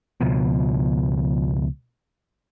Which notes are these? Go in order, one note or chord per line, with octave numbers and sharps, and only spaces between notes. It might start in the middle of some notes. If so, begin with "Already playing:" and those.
C#2 B2 F3